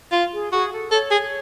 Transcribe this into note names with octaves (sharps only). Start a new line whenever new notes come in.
F4
G#4
F#4 G#4
A4
A4 C#5
G#4